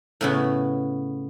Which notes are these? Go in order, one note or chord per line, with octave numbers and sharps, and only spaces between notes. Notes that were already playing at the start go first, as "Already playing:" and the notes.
A2 C#3 B3